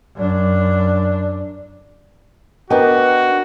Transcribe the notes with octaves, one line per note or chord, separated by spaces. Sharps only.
F#2 D4
B3 D4 F#4 A#4 D#5 G5